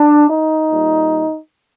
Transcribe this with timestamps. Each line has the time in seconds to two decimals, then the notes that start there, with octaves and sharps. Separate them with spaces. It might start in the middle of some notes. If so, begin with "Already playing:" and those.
Already playing: D4
0.30 D#4
0.70 A#2 G3